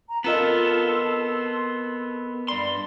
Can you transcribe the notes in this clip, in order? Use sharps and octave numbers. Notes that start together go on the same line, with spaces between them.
A#5
B3 C4 F4 A4 A#4 D#5
C6
G2 D5 B5 C6